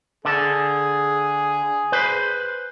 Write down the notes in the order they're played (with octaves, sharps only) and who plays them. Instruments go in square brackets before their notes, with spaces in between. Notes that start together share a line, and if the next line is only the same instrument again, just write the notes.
[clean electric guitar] D3 A5 [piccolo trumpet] G#4
[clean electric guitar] B4 C5